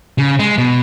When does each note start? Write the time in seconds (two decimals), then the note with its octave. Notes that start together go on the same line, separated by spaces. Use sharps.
0.18 C#3
0.39 G#3
0.58 B2